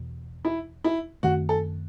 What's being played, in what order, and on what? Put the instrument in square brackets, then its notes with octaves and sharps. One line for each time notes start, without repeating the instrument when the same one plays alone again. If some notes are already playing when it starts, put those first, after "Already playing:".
Already playing: [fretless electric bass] E2 B2
[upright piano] E4
E4
[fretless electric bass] F#2 D#3 A3 C4 [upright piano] F#4
[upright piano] A4